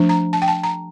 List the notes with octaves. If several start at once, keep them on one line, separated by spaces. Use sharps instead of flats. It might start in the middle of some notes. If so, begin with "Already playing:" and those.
Already playing: F3 A3 D4
A#5
A5
G5
A5
A#5